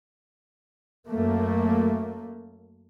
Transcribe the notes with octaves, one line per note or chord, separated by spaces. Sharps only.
F#2 A3 A#3